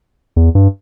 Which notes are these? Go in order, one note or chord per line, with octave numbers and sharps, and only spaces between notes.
E2
G2